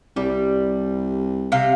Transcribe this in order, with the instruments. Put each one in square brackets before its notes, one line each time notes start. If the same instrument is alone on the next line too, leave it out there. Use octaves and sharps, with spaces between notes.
[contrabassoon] C2 [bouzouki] G3
[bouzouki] C3 F5